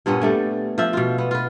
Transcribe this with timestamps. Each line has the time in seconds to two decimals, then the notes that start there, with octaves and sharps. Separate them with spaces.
0.06 G2 A#2 B3 C#4
0.21 G3 A3 D4
0.78 F3 E5
0.93 B2 F4
1.18 B3
1.31 F4 B4